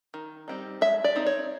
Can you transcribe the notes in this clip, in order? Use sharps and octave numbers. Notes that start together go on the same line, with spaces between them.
D#3
G3 C4 D#4
G#3 E5
D5
C4 D#4
C#5